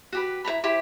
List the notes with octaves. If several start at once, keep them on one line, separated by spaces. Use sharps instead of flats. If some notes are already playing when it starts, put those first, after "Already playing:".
F#4 G4 B4
E4 C5 A#5 B5
E4 G4 C5